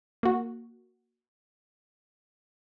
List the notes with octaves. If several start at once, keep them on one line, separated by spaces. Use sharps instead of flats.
A#3 F#4